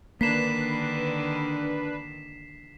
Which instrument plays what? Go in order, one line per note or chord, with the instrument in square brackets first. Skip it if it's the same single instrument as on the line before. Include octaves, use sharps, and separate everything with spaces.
[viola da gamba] D3 D#3 [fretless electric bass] A#3 [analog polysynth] D4 B4 [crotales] B6 C7 E7